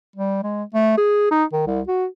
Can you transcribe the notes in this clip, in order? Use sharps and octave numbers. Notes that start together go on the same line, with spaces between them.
G3
G#3
A3
G#4
D#4
D#3
C2
F#4